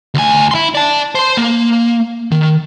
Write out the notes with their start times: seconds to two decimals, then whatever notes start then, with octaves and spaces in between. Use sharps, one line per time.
0.15 D2 G#5
0.51 E4 C6
0.75 D5 A5
1.15 C5 C6
1.37 A#3
2.32 D#3